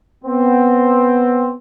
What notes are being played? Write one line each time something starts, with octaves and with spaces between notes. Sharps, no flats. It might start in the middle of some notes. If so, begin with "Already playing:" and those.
B3 C4